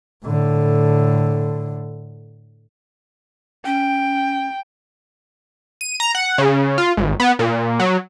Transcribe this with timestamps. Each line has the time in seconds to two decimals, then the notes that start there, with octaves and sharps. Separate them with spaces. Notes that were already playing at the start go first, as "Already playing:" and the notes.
0.24 A2 D3
3.66 C#4 G5
5.81 D#7
6.00 A#5
6.15 F#5
6.38 C#3
6.78 F4
6.97 G#1
7.20 B3
7.39 A#2
7.80 F#3